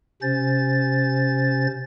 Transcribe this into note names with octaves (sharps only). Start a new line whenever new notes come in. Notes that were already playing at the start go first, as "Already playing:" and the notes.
C3 C#4 C5 A6